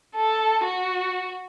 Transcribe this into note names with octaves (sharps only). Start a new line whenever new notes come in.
A4
F#4